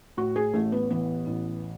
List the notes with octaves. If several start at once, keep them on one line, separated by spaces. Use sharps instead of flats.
A2 F#4
G#4
A1 A3
B3
E3 B3
A1